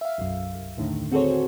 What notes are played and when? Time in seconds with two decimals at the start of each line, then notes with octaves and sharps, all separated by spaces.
0.01 E5 F5
0.18 B1 F#2
0.55 C2
0.77 D#2 A2 D3 D#3
1.12 C4 F#4 G#4 A4 C5 C#5